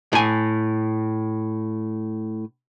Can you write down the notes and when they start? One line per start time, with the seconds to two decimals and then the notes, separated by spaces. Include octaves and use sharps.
0.13 A2 G#5